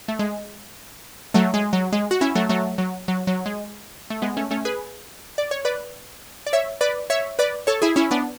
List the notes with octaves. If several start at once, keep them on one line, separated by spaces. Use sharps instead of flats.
A3
G#3
F#3 A3
G#3
F#3
G#3
F#4
C#4 E4
F#3 A3
F#3 A3
F#3
F#3
F#3
G#3
A3
G#3 B3
A3 C#4
A3 C#4
G#4 B4
D5
C#5
B4 D5
D5
C#5 E5
B4 D5
C#5 E5
B4 D5
A4 C#5
E4 G#4
C#4 E4
B3 D4